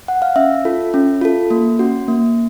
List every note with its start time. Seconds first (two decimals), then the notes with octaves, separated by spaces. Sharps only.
0.08 F#5
0.22 F5
0.36 C#4 E5
0.65 F4 A4
0.94 C#4
1.21 F4 A4
1.51 A#3
1.79 C#4 F#4
2.08 A#3